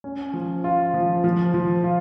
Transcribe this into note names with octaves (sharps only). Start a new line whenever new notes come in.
C#4
F3
F4
F3
F3
F3
F4